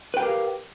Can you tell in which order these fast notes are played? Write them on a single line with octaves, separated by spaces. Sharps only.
B4 G5 A#4 G4 F5